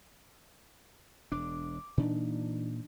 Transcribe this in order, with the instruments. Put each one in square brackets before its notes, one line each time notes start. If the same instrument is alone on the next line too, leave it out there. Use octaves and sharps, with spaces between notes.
[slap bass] E1 D4 [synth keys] D6
[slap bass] A#2 [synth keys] E3 D4 D#4